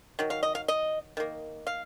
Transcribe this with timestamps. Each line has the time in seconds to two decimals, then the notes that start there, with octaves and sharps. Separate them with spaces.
0.19 D#3 F#3
0.30 F5
0.43 D#5
0.55 F5
0.68 D#5
1.17 D#3 A#3
1.67 F5